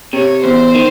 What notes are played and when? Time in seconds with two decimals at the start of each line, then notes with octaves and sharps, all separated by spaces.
0.13 C3 C#5
0.44 E2 C5
0.75 D#3